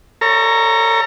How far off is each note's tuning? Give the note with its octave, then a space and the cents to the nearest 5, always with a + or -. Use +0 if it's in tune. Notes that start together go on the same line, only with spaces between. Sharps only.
A4 +35 C#5 +0 A#5 +0